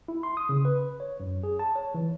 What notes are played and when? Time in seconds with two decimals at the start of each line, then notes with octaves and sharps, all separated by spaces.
0.08 E4
0.23 C6
0.37 D#6
0.49 C#3
0.65 B4
1.00 C#5
1.20 F#2
1.43 G#4
1.59 A5
1.76 C#5
1.94 E3